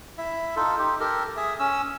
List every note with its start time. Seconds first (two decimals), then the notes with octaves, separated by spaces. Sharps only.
0.18 E4 E5
0.56 D#4 F4 A4
0.79 D#4 G4
1.00 G4 A4 A#4
1.37 G#4 E5
1.59 C#4 E6